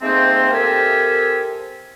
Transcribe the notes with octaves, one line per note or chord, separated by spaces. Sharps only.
G#2 A3 A#3 C4
C4 G4 A4 A#4 E5 G#5